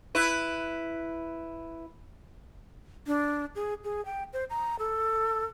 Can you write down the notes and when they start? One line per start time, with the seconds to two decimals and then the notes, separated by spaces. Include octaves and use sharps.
0.15 E4 B4
3.07 D4
3.55 G#4
3.84 G#4
4.05 G5
4.33 C5
4.50 A#5
4.79 A4